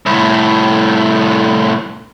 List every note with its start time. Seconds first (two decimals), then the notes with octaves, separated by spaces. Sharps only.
0.06 C2 A2